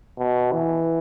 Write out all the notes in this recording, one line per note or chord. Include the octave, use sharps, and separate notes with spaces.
B2
E3